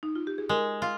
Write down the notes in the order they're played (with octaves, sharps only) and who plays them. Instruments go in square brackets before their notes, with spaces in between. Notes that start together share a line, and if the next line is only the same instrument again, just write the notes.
[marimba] D#4
F4
G4
G#4
[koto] G#3 [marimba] A#4
[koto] F4